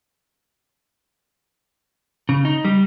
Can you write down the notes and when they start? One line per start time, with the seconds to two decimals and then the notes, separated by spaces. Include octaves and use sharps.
2.29 C#3
2.45 D#4
2.65 G3